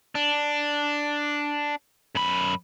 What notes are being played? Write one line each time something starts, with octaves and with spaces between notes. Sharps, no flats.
D4
F#2 B5